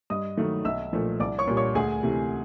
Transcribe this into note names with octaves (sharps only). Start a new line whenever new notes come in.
G2 D#5 D#6
D#3 F#3 A3
B1 E5 E6
A#2 F3 A3
C2 D5 D6
C#5 C#6
A#2 G3
C#5 C#6
D2 G#4 G#5
C3 E3 A3